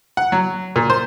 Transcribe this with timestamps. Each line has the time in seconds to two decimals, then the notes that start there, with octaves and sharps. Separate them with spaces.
0.17 F#5
0.32 F#3
0.76 A#2
0.90 C5